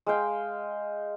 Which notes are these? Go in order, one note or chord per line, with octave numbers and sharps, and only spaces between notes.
G#3 F5 G5